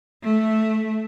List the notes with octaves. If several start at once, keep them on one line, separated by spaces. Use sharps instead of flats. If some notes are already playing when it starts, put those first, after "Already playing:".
A3